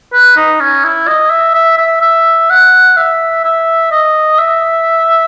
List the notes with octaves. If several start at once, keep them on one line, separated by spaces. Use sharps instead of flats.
B4
D#4
C#4
E4
D#5
E5
E5
E5
E5
F#5
E5
E5
D#5
E5